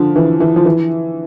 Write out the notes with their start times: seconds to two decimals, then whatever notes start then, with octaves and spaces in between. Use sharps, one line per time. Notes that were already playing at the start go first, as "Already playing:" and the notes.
Already playing: D3 F3
0.16 E3
0.40 E3
0.56 F3
0.65 E3